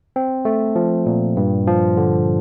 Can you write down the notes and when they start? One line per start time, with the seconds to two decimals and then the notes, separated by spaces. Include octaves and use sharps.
0.16 C4
0.45 A3
0.76 F3
1.06 A#2
1.37 G2
1.67 F3
1.97 D3